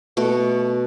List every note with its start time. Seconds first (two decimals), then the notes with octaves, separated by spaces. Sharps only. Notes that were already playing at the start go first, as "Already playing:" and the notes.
0.17 B2 A3 F#4